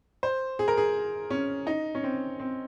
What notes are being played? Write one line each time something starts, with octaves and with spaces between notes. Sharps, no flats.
C5
G#4
A#4
G#4
C#4
D#4
C#4
C4
C4